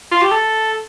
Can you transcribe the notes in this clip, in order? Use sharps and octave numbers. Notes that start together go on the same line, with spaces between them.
F4
G4
A4